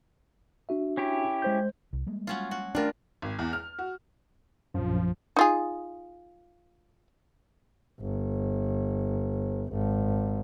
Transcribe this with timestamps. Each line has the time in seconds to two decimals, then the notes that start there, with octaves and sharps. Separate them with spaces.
0.69 D4 F#4 E5
0.97 C#4 E4 G4
1.42 G#3 C5 G6
1.93 C2
2.07 G3 G#3 A#3
2.27 F#3 C#4 F4
2.51 F#4
2.75 G3 A3 C#4 D4 F4 A#4
3.22 G#1
3.39 E2
3.53 F6
3.79 F#4
4.74 A#1 F#2 F3
5.36 D#4 F4 G#4
8.00 G1
9.71 G#1